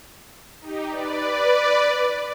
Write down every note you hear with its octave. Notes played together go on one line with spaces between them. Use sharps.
D#4 G4
B4 D5